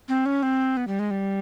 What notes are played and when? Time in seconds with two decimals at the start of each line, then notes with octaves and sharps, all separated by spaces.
0.08 C4
0.26 C#4
0.43 C4
0.77 B3
0.87 G3
0.99 G#3
1.11 G3